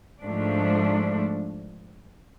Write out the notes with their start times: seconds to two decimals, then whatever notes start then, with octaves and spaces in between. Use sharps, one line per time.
0.22 G#2 F3 A3 D4